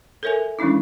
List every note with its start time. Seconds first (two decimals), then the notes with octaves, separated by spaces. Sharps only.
0.23 A4 A#4 C#5 E5 G#5
0.59 E3 G#3 C#4 D4 E4